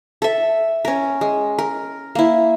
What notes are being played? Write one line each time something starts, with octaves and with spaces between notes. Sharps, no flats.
A4 E5
C#4 A#4
G#3
A#4
A#3 E4